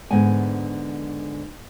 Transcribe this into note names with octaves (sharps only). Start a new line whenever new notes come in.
G#2 D3 B3 G#5